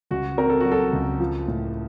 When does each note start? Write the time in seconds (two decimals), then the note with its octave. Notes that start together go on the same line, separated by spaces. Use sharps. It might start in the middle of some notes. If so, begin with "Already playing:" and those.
0.11 C#2 F#4
0.38 C4 A#4
0.50 A4
0.60 F#3 F#4
0.72 A4
0.93 C#2
1.20 F3
1.48 A2